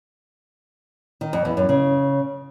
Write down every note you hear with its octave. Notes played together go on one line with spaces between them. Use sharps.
D#3
F2
E2
F#2
C#3